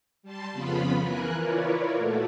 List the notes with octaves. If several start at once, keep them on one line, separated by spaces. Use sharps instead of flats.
G3 A5 C6
F2 C#3 B3 F4 B5
E3 A#4 G#5 F#6
E4 F4 A#4 B4 C#5 D5
A#2 A3 F#4 A4